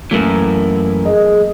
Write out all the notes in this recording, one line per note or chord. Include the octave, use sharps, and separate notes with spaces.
F#2 E3 A3 A#3
G#4 D#5